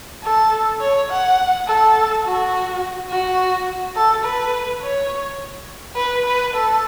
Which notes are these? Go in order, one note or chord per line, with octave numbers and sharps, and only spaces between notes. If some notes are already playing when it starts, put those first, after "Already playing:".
A4
C#5
F#5
A4
F#4
F#4
A4
B4
C#5
B4
B4
A4